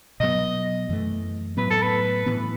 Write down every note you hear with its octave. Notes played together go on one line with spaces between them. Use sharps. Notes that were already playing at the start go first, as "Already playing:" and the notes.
B2 F#3 B3 D#5
F#2 E3 A3
A2 F#3 B3 B4
A4
B4
A2 E3 B3